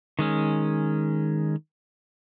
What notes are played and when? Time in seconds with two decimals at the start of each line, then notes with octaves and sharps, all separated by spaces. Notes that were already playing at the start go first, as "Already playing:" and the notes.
0.19 D#3 G#3 C#4